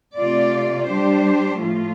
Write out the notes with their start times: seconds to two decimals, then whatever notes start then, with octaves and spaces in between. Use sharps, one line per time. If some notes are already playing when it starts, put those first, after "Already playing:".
0.18 C3 A3 F4 D5
0.89 G3 D4 G4 C5
1.61 A2 F3 A3 F4